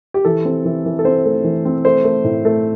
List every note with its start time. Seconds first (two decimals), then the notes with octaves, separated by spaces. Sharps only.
0.14 G4
0.25 E3 A4
0.45 C4
0.65 E3
0.85 E3
0.99 A4
1.04 C4 C5
1.25 A3
1.44 E3
1.65 C4
1.85 A3 C5
2.04 A3
2.24 A2
2.45 A3